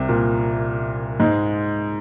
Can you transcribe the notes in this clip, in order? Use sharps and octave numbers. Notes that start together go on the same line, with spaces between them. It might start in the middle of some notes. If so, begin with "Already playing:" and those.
Already playing: C2 C3
A#2
G#2 G#3